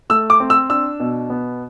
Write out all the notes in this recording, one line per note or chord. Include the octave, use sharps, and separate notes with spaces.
A3 E6
D6
C4
E6
D4 E6
B2
B3